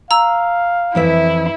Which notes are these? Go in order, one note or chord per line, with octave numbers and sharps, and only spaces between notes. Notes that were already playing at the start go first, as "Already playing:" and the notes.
F5 A#5 E6
F2 E3 E4 E5